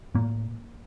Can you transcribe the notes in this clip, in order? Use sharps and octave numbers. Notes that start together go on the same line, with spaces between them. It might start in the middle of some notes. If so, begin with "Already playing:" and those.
A2 A#3